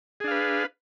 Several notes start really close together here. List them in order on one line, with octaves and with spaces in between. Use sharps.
G#4 D4 F5 B4